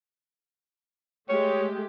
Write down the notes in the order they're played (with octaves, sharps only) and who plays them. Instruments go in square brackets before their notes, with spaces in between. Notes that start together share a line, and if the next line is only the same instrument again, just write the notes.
[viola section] G#3 A3 G4 [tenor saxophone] C#5